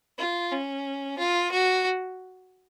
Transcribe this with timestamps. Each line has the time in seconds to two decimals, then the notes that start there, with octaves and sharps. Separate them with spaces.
0.18 F4
0.52 C#4
1.18 F4
1.51 F#4